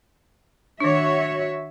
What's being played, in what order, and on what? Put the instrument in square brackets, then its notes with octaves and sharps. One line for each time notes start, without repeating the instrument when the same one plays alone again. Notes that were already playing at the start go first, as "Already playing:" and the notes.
[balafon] D#3 D4 [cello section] F#4 C#5 E5